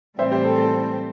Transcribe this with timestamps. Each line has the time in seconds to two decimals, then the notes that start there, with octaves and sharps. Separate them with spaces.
0.18 A2 E3 G3 C4 C5 E5
0.31 G4 C5
0.45 A4
0.58 A4